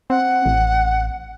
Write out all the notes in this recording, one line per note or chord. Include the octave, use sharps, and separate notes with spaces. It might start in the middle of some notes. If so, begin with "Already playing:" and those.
C4 F#5
A1